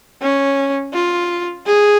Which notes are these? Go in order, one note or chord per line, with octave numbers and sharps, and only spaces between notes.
C#4
F4
G#4